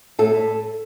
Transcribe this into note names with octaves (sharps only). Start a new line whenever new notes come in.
A2 A4
A2